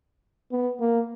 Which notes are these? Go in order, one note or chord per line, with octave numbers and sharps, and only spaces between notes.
B3
A#3